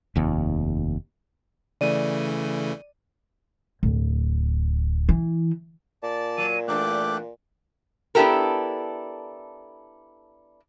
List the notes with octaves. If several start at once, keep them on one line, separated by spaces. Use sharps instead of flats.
F1 D#2
C#3 E3 A3 D5 D#7
D1
E3
A#2 D5 A5
F#3 D#7
E2 A3 D4 G5 D6 F#6
B3 D4 E4 G4 A4 A#4